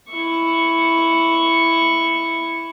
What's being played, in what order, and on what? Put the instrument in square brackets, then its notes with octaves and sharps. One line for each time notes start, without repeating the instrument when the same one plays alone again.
[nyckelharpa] E4 C#6